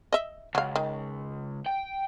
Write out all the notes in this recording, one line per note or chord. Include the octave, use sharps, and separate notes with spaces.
D#5 E5
C#2 F#3 F5
D#3
G5